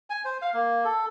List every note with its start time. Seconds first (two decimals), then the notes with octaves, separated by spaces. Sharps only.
0.10 G#5
0.25 C5
0.42 F5
0.54 A#3
0.84 A4